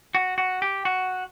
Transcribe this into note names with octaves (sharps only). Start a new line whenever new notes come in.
F#4
F#4
G4
F#4